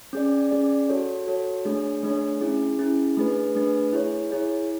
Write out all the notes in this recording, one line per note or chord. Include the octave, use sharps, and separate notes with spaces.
C#4 G#4 D5
C#4 G#4 D5
F#4 A4 C#5
F#4 A4 C#5
A3 D4 G#4 C#5
A3 D4 G#4 C#5
C#4 E4 G#4
C#4 E4 G#4
A3 D4 G#4 B4
A3 D4 G#4 B4
E4 G#4 C#5
E4 G#4 C#5